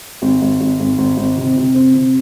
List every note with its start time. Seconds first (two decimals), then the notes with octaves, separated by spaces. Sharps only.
0.22 G#1
0.42 G#1
0.61 G#1
0.80 G#1
0.98 G#1
1.17 G#1
1.36 C3
1.56 C3
1.75 C4
1.94 C3